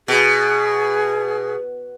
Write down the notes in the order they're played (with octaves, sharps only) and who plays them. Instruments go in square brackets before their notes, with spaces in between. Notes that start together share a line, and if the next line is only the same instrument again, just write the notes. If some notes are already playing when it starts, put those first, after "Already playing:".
[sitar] B2 [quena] G#4